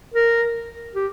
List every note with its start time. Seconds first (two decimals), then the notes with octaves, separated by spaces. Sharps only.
0.14 A#4
0.95 G4